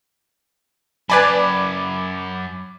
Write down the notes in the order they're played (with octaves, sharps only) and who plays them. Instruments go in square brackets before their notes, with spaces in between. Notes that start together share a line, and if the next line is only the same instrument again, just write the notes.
[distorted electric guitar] F#2 A5 [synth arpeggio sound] B4 D5 G#5 [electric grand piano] B5 D6 G#6